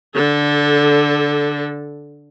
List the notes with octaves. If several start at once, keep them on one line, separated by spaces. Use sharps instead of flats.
D3 A4